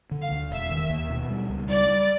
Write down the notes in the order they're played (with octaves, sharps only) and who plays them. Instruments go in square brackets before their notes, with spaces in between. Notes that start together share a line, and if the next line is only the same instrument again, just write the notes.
[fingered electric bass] D3
[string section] F5
[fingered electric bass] D2
[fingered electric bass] E1 [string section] E5
[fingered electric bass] D#3
D#2
B2
G3
C#2
[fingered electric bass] G3 [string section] D5
[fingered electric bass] G3